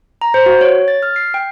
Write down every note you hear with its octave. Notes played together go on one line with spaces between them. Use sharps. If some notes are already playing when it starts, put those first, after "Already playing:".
A#5
C5
F#4
C#5
A6
F6
C7
G5